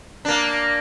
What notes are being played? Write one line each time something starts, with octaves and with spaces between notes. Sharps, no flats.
A#3 D4